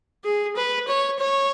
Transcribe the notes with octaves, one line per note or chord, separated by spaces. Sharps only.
G#4
B4
C#5
C#5